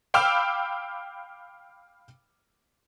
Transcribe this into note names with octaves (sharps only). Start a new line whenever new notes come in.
F5 G5 B5 D6 E6 F6